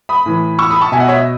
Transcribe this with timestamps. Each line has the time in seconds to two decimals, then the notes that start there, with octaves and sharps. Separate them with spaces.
0.09 B5 D#6
0.26 A2 E3
0.59 C#6 E6
0.70 B5 D#6
0.81 A5 C#6
0.92 B2 E5 G#5
1.00 D#5 F#5
1.08 C#5 E5
1.17 D#5